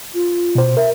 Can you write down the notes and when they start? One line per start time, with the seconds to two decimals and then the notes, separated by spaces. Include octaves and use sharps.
0.14 F4
0.55 B2 C5
0.77 A#4 E5